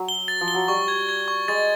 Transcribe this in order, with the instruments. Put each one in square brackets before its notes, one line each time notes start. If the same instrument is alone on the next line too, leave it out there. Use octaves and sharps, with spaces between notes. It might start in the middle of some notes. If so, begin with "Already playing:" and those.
Already playing: [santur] F#3
[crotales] G7
A6
[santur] F3
[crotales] G7
[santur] F#3
[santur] G3 [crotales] C#6
[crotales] G#6
G#6
C#6
[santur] G#3 [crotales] A6